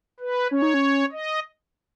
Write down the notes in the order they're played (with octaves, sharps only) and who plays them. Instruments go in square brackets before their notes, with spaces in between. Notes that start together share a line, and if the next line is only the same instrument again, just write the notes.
[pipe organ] B4
[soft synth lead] C#4 [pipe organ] C#5
[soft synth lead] D#4
C#4
[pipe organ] D#5